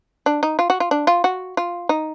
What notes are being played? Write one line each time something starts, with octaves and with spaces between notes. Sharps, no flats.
D4
D#4
F4
F#4
F4
D4
F4
F#4
F4
D#4